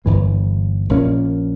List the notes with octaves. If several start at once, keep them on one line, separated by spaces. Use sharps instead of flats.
G1 G2 E3 A#3
A#1 A#2 A#3 C#4